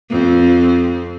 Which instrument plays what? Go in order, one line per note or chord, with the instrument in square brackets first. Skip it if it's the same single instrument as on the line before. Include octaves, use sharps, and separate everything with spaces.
[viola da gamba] F2 C4